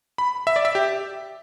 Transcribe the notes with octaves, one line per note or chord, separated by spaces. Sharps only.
B5
E5
D5
E5
G4